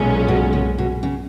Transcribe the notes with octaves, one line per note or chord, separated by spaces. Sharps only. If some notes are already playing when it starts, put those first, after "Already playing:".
Already playing: B1 A#2 G#3 C#4
B2
C#3
B2
C#3